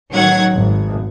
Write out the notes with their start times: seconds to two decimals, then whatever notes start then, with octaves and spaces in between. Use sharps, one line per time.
0.12 A1 D#3 F#3 C#5 F#5 G#6
0.54 G#1